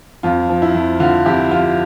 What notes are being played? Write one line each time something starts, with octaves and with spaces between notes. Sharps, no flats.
F2 F4
F3
E4
F2
D3 F4
F2 E4 G4
F3 F4